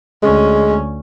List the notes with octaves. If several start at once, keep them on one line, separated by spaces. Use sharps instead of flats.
D2 G#3 C#4